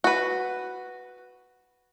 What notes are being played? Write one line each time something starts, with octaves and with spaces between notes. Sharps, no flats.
F#4 B4